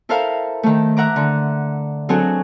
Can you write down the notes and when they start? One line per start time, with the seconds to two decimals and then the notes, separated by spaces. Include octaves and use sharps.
0.09 E4 A4 A#4 C5 E5 F5
0.63 D#3 A3
0.97 E5 F#5 A#5 D6
1.16 D3
2.09 F#3 C4 D4 F#4 G#4 A4